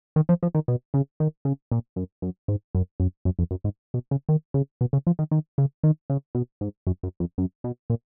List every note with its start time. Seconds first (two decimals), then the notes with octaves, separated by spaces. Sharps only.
0.16 D#3
0.29 F3
0.43 F3
0.55 D#3
0.68 B2
0.94 C#3
1.20 D#3
1.45 C#3
1.71 A#2
1.96 F#2
2.22 F#2
2.48 G#2
2.75 F#2
3.00 F#2
3.25 F#2
3.39 F2
3.51 F#2
3.64 G#2
3.94 B2
4.11 C#3
4.29 D#3
4.54 C#3
4.81 B2
4.93 C#3
5.07 F3
5.19 D#3
5.31 D#3
5.58 C#3
5.83 D#3
6.10 C#3
6.35 B2
6.61 G#2
6.87 F#2
7.03 F#2
7.20 F2
7.38 F#2
7.64 B2
7.90 A#2